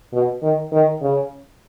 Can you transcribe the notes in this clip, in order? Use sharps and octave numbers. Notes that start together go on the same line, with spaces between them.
B2
D#3
D#3
C#3